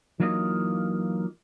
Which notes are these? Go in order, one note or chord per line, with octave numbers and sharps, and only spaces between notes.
E3 F#3 A#3 D#4 F4 D#5